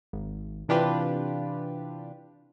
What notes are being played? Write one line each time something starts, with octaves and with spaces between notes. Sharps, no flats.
G#1
C3 E3 D4 F4 G4 B4